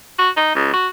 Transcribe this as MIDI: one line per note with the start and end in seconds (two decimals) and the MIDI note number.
0.19 0.30 66
0.37 0.53 63
0.55 0.70 37
0.73 0.88 66